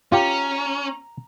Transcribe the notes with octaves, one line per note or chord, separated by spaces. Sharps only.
C#4 F4 G4 A#5